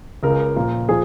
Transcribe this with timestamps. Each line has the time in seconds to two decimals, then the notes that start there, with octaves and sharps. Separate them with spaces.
0.23 C#2 C#3 G#3 A#4
0.56 A#2 F3 A#3
0.89 F3 G#4